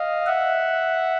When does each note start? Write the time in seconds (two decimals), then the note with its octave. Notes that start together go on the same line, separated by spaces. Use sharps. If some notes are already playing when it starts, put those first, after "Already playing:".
Already playing: D#5 F5
0.26 E5 F#5